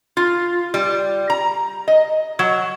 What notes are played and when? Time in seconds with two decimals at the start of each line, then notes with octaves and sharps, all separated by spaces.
0.17 F4
0.74 G3
1.30 A#5
1.88 D#5
2.39 F#3